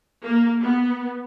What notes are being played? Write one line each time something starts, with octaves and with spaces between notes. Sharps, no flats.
A#3
B3